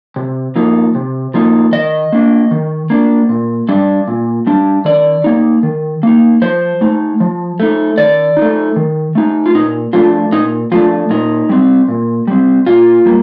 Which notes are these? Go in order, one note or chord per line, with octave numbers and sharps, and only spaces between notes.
C3
F3 A#3 D#4
C3
F3 A#3 D#4
D#3 D#5
A#3 D4
D#3
A#3 D4
A#2
G3 D4
A#2
G3 D4
D#3 D5
A#3 D#4
D#3
A#3 D#4
F3 C5
A3 D#4
F3
A3 D#4
D#3 D5
D#4
A3
D#3
A3 D#4
F4
A#2 D#4
F3 A3 D4 F4
A#2 D#4
F3 A3 D4 F4
A#2 D#4
G3 C4
A#2
G3 C4
A#2 F4
G3 A#3